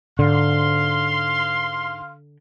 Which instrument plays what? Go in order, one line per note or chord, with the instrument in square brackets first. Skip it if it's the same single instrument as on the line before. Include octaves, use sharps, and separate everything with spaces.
[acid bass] G#2 [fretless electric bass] D3 [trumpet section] F5 C6